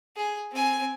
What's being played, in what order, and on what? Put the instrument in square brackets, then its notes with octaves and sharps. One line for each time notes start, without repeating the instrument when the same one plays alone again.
[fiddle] G#4
C4 G#5